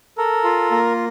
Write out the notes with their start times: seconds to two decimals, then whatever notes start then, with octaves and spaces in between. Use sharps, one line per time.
0.18 A4 A#4
0.44 F4
0.71 A#3